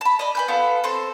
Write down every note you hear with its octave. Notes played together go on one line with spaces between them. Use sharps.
A5 B5
D5 D#5
B4 G#5 G6
B3 F4 A4
C4 A4 C5